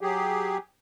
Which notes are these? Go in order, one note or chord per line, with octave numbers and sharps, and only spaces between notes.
F#3 G4 G#4